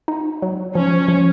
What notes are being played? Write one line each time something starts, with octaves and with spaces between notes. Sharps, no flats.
D#4
F#3
F3 C#4
F3